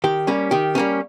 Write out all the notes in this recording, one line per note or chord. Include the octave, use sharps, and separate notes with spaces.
D#3 G4
G3 A#3 C#4
D#3 G4
G3 A#3 C#4